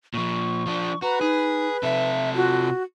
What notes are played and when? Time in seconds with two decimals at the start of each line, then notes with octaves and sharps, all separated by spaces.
0.14 A#2 F3 C#6
0.66 F3 D4
1.02 F#4 B4 A#5
1.21 D#4 G#4
1.83 C3 A4 E5
2.35 F4 F#4